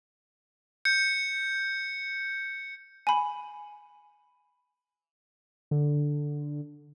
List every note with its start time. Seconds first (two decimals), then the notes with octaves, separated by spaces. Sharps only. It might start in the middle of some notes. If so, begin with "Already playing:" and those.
0.85 G6 C#7
3.07 G#5 B5
5.71 D3